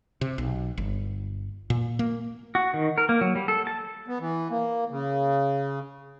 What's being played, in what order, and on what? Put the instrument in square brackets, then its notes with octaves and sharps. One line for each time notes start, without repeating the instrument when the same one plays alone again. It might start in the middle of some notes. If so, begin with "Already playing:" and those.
[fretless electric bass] C3
B1
G1
A#2
A#3
[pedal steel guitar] F#4
D#3
A#4
A#3
F#3
G3
A4
A5
[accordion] B3
E3
A#3
C#3